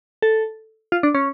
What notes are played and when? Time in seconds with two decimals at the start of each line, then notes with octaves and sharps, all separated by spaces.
0.22 A4
0.92 F4
1.03 D4
1.15 C#4